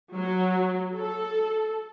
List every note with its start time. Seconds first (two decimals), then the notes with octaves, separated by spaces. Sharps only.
0.14 F#3
0.96 A4